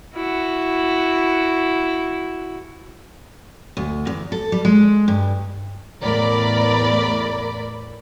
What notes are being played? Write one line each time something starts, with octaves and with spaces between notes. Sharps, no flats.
E4 F#4
D2
E2
A4
G3
G#3
G2
E2 A2 A#4 D5 B5